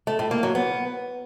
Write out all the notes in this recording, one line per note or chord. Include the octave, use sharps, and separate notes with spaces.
A3
A2
A#3
F#3
B3